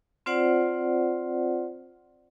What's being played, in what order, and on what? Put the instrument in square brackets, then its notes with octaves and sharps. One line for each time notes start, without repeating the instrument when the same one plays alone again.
[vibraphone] C4 F4 C5 D5 F#5